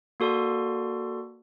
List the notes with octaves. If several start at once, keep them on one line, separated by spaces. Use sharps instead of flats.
A#3 F#4 A4 D5 C6